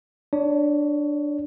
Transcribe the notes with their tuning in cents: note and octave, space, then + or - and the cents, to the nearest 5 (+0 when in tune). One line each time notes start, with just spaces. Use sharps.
D4 +5 C#5 +25